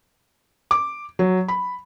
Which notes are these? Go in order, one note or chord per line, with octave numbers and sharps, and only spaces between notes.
D6
F#3
B5